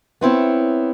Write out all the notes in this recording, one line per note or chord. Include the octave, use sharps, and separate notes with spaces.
B3 C4 E4 C#5